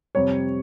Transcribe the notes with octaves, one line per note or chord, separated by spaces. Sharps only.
F2 C3 G3 C#5